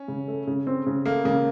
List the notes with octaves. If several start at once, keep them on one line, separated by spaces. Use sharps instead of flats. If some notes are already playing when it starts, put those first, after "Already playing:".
Already playing: C#4
C#3
A3
C#3
C4
C#3
A3 A#3
C#3 A#3